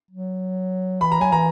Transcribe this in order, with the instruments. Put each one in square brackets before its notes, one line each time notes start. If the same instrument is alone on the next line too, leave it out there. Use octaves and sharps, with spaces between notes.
[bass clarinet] F#3
[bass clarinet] E3 [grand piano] B5
[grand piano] A#5
[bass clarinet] F#3 [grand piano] G#5
[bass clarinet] E3 [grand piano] A#5